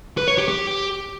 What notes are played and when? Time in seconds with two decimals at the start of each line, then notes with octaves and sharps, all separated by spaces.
0.17 B4
0.28 C#5
0.38 G4
0.48 G4